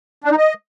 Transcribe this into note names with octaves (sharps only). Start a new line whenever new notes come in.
D4
D#4
D#5